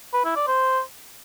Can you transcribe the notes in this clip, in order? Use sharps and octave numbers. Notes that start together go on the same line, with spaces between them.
B4
E4
D5
C5